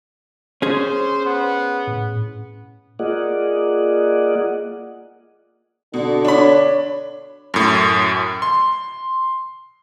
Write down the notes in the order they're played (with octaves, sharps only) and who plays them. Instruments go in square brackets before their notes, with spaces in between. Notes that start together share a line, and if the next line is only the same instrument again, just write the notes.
[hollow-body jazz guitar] C#4 G#4 [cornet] C5
[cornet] B3
[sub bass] A2
[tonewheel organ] A#3 F4 G#4 D5 D#5 F#5
[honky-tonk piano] B2 [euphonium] D3
[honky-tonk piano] D4 B5 [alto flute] C#5
[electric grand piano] F#2 A2
C6